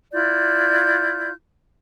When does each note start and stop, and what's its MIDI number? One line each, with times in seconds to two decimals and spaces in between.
0.12 1.31 64
0.12 1.31 65
0.12 1.31 74
0.12 1.31 91